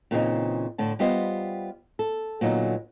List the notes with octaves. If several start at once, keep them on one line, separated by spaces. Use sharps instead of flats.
A#2 C#3 E3 B3 C4 D#4
A2 D3 A5
G3 B3 F4 G4 C5 D#5
A4
A#2 D3 F#3 B3 D#4